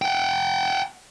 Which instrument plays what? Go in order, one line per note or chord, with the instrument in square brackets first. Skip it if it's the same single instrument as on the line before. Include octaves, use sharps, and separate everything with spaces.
[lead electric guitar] F#5 G5